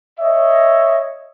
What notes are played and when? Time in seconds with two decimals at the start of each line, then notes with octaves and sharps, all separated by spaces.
0.19 C#5 D#5 E5